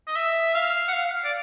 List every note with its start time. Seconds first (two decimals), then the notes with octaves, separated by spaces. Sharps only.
0.07 D#5
0.16 E5
0.55 F5
0.88 F#5
0.93 F5
1.25 D5